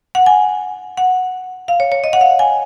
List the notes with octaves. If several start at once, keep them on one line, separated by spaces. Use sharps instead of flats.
F#5
G#5
F#5
F5
C#5
C#5
D#5
F#5
F5
G#5